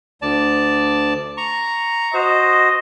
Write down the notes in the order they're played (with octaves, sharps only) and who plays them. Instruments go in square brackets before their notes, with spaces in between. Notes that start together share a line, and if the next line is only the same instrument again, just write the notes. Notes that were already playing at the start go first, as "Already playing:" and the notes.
[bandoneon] D2 D5 A5
A#5 C#6
[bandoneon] F#4 C5 [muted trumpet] D#5